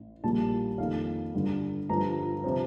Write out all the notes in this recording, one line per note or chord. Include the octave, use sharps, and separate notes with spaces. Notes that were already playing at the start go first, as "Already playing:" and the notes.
Already playing: A1
A#1 A#2 G3 A#3 A5
F2 D#3 A#3 F5
G1 G2 D3
G1 G2 F3 A#5
C3 F3 C4